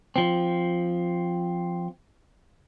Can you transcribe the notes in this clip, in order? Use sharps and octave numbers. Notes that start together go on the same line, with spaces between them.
F3 C4